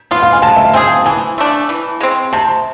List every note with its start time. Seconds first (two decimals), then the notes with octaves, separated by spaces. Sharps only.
0.11 B3 F4 F5
0.23 F5
0.33 G#5
0.42 G#3 A5
0.56 E5
0.65 F5
0.73 C4 E4 G#4 G#5
1.06 E3 G#5
1.38 A3 D4
1.69 E3
2.00 G#3 C4
2.33 C3 A5